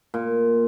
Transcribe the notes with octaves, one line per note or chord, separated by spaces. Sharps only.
A#2